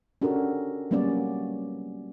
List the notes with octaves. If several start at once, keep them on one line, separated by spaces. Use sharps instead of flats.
C#4 D4 F#4 G4 A4 A#4
F#3 G3 A#3 B3 C#4 D5